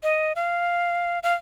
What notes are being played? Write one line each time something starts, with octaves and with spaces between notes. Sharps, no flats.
D#5
F5
F5